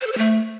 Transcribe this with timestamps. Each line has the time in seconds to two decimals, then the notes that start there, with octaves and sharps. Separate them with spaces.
0.01 C5
0.07 A4
0.12 C5
0.18 A3